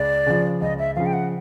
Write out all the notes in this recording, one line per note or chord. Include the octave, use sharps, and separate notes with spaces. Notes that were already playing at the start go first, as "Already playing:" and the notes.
Already playing: C#2 D5
C#3 F3
C#2 D#5
E5
C#3 F3 F5
G5
F#5